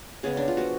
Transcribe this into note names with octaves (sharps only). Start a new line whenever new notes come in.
C#3 G#3 B3 G#4
D4
F4
F3 B3 F#4